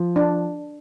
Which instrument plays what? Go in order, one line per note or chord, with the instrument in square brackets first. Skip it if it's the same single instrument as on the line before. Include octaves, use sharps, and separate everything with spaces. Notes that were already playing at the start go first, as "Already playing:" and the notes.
Already playing: [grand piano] F3
[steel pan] D4